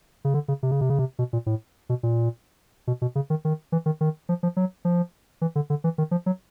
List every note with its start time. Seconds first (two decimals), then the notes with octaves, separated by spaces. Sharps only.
0.25 C#3
0.34 D3
0.48 C#3
0.63 C3
0.71 C#3
0.81 C3
0.90 C#3
0.99 C3
1.19 B2
1.33 A#2
1.46 A2
1.89 B2
2.03 A#2
2.87 B2
3.02 B2
3.15 C#3
3.30 D#3
3.45 D#3
3.72 E3
3.86 D#3
4.01 D#3
4.29 F3
4.43 F3
4.57 F#3
4.85 F3
5.41 E3
5.55 D3
5.70 D3
5.84 E3
5.98 D#3
6.11 F3
6.26 F#3